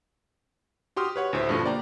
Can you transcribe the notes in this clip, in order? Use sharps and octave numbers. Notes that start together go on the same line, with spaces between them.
F#4 G4 C6 D#6 F6
B4 C#5 F#5
D2 A2 C5 E5
G2 B2 D3 F3 A3
A#3 D5 G5 A#5